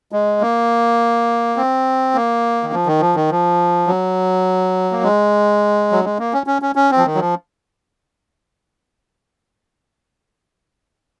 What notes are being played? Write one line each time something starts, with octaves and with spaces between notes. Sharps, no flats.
G#3
A#3
C4
A#3
D#3
F3
D#3
F3
D#3
F3
F#3
A#3
G#3
F#3
G#3
A#3
C#4
C#4
C#4
C#4
C4
F3
D#3
F#3
F3